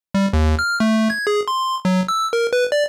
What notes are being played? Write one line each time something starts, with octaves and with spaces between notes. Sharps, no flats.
G3
D#2
F6
A3
G#6
G#4
C6
F#3
E6
A#4
B4
D5